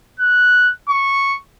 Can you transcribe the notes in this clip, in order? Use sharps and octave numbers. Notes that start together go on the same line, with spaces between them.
F#6
C#6